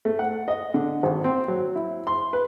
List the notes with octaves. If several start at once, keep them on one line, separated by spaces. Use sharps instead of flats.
A3
F#5
D#5
D3
G#1
C4
F#3
E4
C6
B4